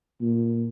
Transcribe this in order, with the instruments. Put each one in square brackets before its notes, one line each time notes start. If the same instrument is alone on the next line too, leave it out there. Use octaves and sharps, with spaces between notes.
[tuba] A#2